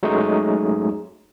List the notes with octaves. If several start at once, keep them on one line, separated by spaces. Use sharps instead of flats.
F#3 G#3 A3 C#4 D#4 G#4